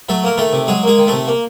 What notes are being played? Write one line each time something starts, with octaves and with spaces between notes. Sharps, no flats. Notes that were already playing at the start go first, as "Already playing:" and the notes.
F#3 A3 A4
A#3 A#4
D#3 A3 A4
C3
F#3 G#3 G#4
G#3 A#3 G#4
D#3
C3 A3 A4
A#3